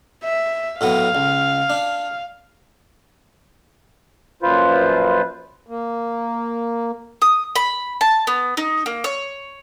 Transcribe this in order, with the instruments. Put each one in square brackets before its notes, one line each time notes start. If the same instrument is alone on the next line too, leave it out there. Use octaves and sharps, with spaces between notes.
[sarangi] E5
[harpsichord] A2 F#3 B3 [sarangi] F5
[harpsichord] C#2
D4
[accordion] F#2 A#2 F3 F4 B4 C5
[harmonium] A#3
[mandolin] D#6
B5
A5
B3
D#4
A#3
C#5